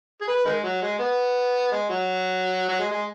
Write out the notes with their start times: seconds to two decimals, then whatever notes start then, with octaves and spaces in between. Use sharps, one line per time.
0.21 G#4
0.28 B4
0.45 D#3 G#3
0.63 F#3
0.82 G#3
0.99 B3
1.72 G#3
1.89 F#3
2.69 F#3
2.79 G#3
2.91 G#3